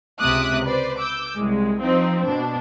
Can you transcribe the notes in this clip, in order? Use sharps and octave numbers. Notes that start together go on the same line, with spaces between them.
C#2 C3 E5 D6 D#6 F#6
B4 C5 D5
D6 E6 G6
C2 G#3
F3 C4 D#4
B2 D4